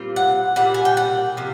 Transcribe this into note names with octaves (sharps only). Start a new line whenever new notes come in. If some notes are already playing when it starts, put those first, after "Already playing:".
Already playing: A#2 G3 C4 F4
F#5
A#2 G3 F#5
G#5
G5
F#5
C3 F3